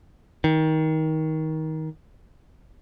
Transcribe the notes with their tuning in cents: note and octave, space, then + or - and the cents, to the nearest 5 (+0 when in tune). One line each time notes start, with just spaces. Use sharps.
D#3 +20